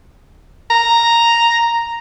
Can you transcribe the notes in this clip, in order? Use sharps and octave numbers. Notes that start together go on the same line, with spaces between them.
A#5